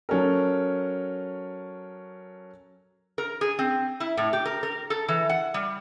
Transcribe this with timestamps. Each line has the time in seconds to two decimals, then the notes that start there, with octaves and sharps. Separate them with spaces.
0.09 F#3 C#4 A4 A#4
3.18 A#4
3.41 G#4
3.59 C4
4.00 E4
4.17 A2
4.33 G4
4.45 A#4
4.63 A#4
4.90 A4
5.08 E3
5.29 F#5
5.54 G3